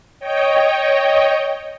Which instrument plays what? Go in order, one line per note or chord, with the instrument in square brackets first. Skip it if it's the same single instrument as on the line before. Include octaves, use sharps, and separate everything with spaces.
[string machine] C#5 D#5 G5